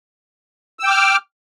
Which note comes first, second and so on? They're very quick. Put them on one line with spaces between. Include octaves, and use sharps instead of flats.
E6 G5 D6 F6